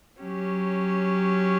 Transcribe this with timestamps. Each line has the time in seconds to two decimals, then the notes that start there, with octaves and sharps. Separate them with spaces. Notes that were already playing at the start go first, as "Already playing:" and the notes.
0.20 F#3 C#4 G4